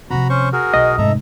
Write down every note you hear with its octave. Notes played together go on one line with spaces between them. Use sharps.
C3 F3 F#4 A#5 B5
C#4 C5 C#6
F#4 G#4 A#4
B1 D#5
F1 G#2 A4 E5 A#5